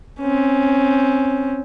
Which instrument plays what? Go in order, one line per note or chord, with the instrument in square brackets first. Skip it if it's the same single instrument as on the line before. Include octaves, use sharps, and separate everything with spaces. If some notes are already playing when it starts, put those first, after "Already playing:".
[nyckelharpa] C4 C#4